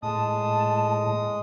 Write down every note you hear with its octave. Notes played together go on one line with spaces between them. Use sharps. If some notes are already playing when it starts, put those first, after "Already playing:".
A2 G#3 A5 D#6